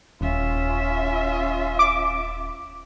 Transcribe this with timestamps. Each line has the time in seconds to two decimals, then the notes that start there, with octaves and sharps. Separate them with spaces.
0.21 D#1 C#4 F4 E5
1.79 D6